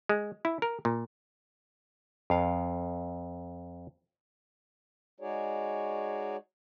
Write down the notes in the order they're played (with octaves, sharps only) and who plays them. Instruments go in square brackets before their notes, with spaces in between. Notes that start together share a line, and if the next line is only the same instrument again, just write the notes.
[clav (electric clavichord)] G#3
E4
A#4
A#2
F2 F5
[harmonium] G#3 D#4 F#4 G#4 C#5 D5